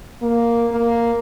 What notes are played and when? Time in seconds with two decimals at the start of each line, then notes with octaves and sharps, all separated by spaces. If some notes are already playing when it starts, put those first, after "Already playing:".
0.22 A#3
0.72 A#3